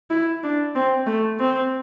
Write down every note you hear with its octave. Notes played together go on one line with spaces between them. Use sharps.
E4
D4
C4
A3
C4